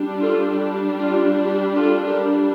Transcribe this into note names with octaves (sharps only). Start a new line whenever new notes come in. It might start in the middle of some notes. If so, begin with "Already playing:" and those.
Already playing: G3 D4
F4 A4
F4
G4
F4 A4
G4 A#4